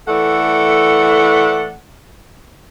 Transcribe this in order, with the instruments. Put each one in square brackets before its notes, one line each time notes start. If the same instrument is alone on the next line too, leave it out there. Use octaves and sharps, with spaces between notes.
[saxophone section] E3 A3 A4 D5 F#5